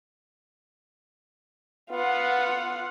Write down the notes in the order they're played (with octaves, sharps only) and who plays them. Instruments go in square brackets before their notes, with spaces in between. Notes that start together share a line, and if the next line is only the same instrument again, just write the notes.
[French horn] B3 [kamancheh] F4 F#5